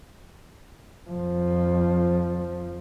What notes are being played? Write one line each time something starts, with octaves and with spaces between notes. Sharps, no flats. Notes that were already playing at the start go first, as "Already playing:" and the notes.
F2 F3